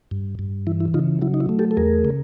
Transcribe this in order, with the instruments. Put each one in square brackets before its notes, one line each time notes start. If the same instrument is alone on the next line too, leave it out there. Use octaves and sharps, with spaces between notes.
[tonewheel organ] G2
G2
E3 E4
E4
C#3 D#4 F4
F#3 E4
D#4
E4
A3
G4 A4
A4
E2 G#4 A#4
C#3